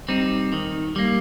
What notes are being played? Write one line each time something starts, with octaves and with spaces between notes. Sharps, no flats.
G3 C4 D#4
D#3
G3 A#3